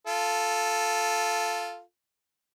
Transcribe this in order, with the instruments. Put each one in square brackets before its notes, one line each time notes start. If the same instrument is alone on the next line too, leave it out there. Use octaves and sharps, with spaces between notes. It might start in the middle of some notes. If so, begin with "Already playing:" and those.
[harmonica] F4 A4